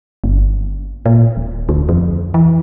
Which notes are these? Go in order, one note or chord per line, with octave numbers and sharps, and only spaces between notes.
G1
A#2
D#1
D2
F2
E3